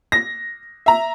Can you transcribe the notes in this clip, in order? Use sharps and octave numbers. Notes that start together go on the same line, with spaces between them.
A#6
E5 A#5